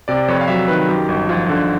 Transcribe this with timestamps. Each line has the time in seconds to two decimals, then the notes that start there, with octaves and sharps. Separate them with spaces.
0.08 C3 D5
0.28 F2 C#5
0.41 F5
0.48 F#3 E5
0.68 D#3 B4
0.88 F#2 G4
1.09 G1
1.29 F3 F4
1.49 D3